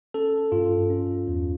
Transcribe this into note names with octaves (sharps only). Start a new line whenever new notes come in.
C#4 A4
G2 F4
C#4
E2